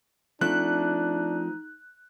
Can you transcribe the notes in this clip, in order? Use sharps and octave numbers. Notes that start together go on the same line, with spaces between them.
F3 A3 C4 D4 D#4 F#6